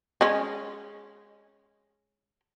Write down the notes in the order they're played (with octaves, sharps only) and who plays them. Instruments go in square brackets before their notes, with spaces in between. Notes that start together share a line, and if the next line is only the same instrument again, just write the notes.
[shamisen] G#3 C#4